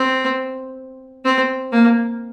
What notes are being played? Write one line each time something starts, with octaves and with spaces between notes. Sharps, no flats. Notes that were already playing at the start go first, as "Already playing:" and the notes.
Already playing: C4
C4
A#3